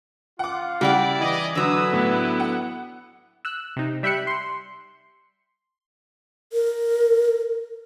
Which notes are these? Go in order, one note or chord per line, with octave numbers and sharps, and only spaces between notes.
F4 F#5 D6
C#3 G3 E4 D5 F#5 G5
E3 D#5
D3 F#3 B4 D#6 E6
A2 B3 E4
F#5
E6 F#6
C3 D#4
G3 E5 G5 B5 F#6 C#7
C6
A#4